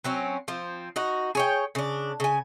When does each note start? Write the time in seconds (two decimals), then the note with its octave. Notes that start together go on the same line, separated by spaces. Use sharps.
0.04 F#3 C4 C#4
0.48 F3 C4
0.96 D#4 F#4
1.35 G#4 C#5 G5
1.75 C#3 D4
2.20 C#3 G#5